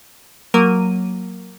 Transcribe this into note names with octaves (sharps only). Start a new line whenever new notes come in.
F#3 A#3 A#4 D#7